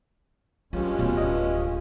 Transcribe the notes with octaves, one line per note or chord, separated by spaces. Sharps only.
G2 F#3 G#3 C#4 F4 G4
D1 B2
D#5